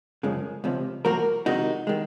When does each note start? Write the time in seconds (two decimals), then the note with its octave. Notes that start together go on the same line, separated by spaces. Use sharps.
0.23 F#2 C#3 F3 G#3
0.64 C#2 C3 F3
1.05 G#2 F3 A#3 F#4 A#4
1.46 F2 C3 D#3 G#3 D#4 F#4
1.87 D#3 G#3